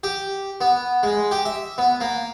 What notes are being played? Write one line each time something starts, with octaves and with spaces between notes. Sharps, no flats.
G4
B3
G#3
G4
E5
B3
A#3